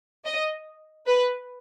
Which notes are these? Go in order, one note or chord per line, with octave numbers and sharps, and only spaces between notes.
D#5
B4